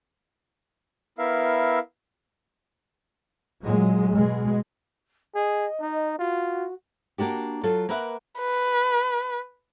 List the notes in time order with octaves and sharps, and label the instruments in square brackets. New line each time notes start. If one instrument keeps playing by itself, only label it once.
[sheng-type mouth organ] B3 E4 A#4 E5 F5
[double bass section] A#2 F#3 G#3
B2 G#3
[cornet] G#4 [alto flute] D#5
[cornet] D#4
[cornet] F4 [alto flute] F#4
[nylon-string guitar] A#3 D4 F#4 G4
F#3 F4 A4
A#3 A#4 B4 E5 F#5
[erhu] B4